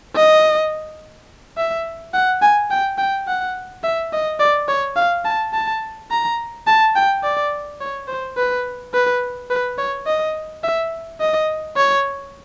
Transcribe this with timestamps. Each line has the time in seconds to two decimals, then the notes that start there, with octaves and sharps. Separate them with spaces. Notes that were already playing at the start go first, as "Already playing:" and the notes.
0.16 D#5
1.57 E5
2.14 F#5
2.41 G#5
2.71 G5
2.98 G5
3.27 F#5
3.84 E5
4.13 D#5
4.40 D5
4.68 C#5
4.96 F5
5.25 A5
5.54 A5
6.11 A#5
6.67 A5
6.96 G5
7.23 D5
7.81 C#5
8.08 C5
8.37 B4
8.93 B4
9.50 B4
9.78 C#5
10.06 D#5
10.64 E5
11.21 D#5
11.77 C#5